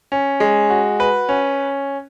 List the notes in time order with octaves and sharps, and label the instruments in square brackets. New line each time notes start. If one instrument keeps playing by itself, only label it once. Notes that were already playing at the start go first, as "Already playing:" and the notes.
[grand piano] C#4
G#3
F#4
B4
C#4